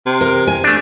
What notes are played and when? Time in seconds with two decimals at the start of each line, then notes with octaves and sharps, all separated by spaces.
0.06 C3
0.21 A#4
0.47 G#5
0.64 A3 D4